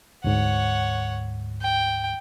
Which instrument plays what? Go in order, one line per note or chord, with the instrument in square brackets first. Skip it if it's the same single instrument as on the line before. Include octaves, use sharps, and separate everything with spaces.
[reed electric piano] D2 G#2 [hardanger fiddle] C#5 F#5
[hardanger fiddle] G5